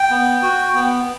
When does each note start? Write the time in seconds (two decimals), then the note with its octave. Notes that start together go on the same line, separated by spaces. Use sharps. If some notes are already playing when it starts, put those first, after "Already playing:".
Already playing: G5
0.11 B3
0.42 F#4
0.74 B3